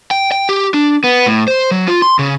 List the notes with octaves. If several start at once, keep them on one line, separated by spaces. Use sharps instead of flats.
G5
G5
G4
D4
B3
A2
C5
F#3
F4
C6
C#3